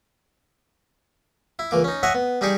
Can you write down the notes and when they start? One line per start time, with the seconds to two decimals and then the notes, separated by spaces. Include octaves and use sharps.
1.59 E4
1.71 C#2 E3 A#3 D6
1.84 C#4 D#4
2.03 C#5 D#5 E5 F#5 G#5
2.14 B3
2.41 G3 D#4 G4 G#4 D5 C#6